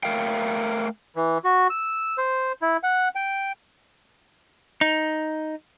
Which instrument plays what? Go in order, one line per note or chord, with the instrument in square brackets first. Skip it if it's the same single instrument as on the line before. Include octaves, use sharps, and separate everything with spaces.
[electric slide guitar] A3 A#4 F5 G5
[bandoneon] E3
F#4
E6
C5
E4
F#5
G5
[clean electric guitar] D#4